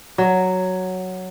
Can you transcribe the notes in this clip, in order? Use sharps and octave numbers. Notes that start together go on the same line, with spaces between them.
F#3